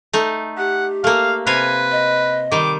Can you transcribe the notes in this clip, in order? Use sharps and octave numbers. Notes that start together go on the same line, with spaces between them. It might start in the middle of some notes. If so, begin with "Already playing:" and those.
A3 D#4
G4 F#5
A3 A#3 F5
C3 B4 F5 G#5
D#5
D#3 G3 D6